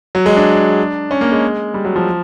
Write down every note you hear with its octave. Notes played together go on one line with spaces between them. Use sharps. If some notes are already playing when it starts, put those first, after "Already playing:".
F#3
G#3
D4
C#4
A#3
G#3
G3
F#3
F3